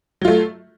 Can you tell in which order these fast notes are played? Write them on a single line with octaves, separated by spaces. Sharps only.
F#3 F4 A3